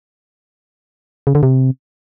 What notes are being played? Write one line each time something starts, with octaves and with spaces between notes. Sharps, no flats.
C#3
D3
C3